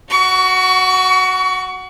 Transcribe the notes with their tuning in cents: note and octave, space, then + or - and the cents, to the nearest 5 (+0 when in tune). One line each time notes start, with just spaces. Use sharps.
F#4 +0 C#6 +30